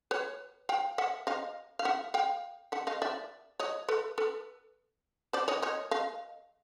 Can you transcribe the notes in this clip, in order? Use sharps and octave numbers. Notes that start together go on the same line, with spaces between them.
B4 C#5
F5 G5
E5 F#5
D#5 F5
F5
E5 F#5
F5 G5
E5 F#5
D#5 F5
D5 E5
C#5 D#5
A4 B4
A4 B4
C5 D5
C#5 D#5
C#5 D#5
D#5 F5